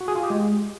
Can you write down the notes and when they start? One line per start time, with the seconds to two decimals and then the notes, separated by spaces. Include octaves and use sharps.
0.01 F#4
0.08 G#4
0.15 F4
0.23 G4
0.30 G#3